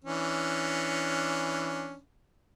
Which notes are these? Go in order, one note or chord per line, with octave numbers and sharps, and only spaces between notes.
E3 C#4 D4